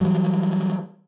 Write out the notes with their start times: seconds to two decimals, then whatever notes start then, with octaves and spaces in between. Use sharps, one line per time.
0.01 E3 F#3 G3